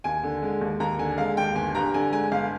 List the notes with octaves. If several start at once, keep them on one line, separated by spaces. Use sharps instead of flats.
D#2 G#5
D3
G#3
D#2
D#2 A#5
D3 G#5
G#3 F5
D#2 G5
G1 G#5
G2 A#5
D3 G#5
G#3 G#5
G1 F5